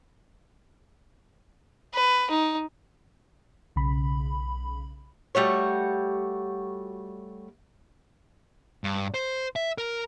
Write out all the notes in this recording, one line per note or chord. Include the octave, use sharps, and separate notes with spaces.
B4
D#4
B1 C#3 B5
G3 A3 F#4 C#5
G2
C5
E5
A#4